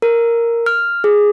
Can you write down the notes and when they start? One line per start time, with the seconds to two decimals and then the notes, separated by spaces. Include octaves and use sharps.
0.02 A#4
0.66 F6
1.04 G#4